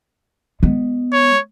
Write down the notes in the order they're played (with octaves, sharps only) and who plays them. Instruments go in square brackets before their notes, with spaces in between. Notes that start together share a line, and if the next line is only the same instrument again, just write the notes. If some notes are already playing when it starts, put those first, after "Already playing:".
[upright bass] G#3 B3
[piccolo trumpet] C#5